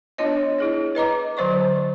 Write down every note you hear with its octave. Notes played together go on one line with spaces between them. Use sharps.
B3 D4 F4 C#5 D#5
E4 G#4 C#5
B4 D#5 A#5 D6
D3 F#3 C5 D5 C#6